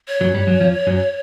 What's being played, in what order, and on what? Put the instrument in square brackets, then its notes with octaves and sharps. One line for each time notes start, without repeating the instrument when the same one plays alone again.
[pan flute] C#5
[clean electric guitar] F#2 F#3
G2 G3
F#2 F#3
F2 F3
F#2 F#3